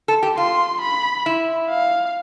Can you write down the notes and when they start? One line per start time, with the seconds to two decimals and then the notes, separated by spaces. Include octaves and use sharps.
0.08 A4
0.23 G4
0.37 F4 C6
0.81 B5
1.26 E4
1.69 F5